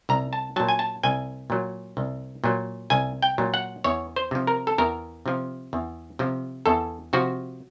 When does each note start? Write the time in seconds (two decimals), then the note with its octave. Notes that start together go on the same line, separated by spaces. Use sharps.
0.09 C2 A#5
0.33 A5
0.56 A#2 F#3 A5
0.69 G#5
0.79 A5
1.03 C2 G#5
1.50 A#2 F#3
1.97 C2
2.44 A#2 F#3
2.90 C2 G#5
3.22 G5
3.38 A#2 F#3
3.54 F#5
3.84 E2 C#5
4.16 C5
4.31 C3 F3
4.47 A#4
4.67 A4
4.78 E2 A#4
5.26 C3 F3
5.73 E2
6.19 C3 F3
6.66 E2 A4
7.13 C3 F3 F#4